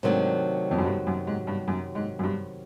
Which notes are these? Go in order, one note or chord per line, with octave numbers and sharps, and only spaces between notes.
G#2 C3 D#3 F#3 A3 D4
F2
F#2
G2
F#2
G#2
G2
F#2
G#2
F#2
G2